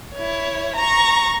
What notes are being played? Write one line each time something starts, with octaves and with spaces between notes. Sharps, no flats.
E4 C#5
A#5 C#6